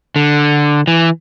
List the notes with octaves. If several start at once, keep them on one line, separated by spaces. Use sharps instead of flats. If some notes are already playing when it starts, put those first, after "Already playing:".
D3
E3